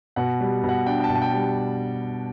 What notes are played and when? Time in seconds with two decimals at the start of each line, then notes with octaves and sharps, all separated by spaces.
0.16 B2 F#5
0.40 G3
0.64 B2
0.69 F#5
0.86 D4 G5
1.00 G5
1.04 A5
1.10 B2
1.15 A5
1.22 G5
1.33 G3